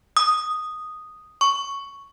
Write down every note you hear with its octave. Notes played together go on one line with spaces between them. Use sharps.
D#6
C#6